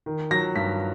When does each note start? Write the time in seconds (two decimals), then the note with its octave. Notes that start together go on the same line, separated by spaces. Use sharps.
0.06 D#3
0.31 F#3 A#6
0.56 G2 B6